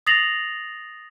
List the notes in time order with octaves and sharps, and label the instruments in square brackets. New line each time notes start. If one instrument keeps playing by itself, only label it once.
[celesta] D#6 A6 A#6 C7 F7 F#7